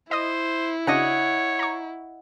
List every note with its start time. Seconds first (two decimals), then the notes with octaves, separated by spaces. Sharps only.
0.11 E4 C5 D#5 D#6
0.87 C#3 D4 F#4 C#5 D#5 F#5
1.59 A#5 C#6